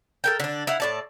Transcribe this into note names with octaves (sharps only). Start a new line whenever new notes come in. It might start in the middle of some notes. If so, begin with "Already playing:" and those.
A4 A#4 G5
D3 D4
E4 F5 F#5
A2 D5 A5